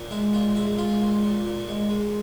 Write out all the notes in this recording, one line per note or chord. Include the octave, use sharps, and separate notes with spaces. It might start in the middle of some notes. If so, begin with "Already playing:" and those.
Already playing: A#2
G#3 E4
A#2 F4
G#3 E4
G#3 F4
A#2
A#2
A#2
G#3
G#3